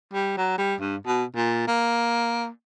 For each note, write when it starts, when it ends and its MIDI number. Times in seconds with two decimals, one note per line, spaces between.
0.13 0.35 55
0.38 0.55 54
0.58 0.75 55
0.80 0.96 43
1.07 1.25 47
1.36 1.66 46
1.68 2.48 58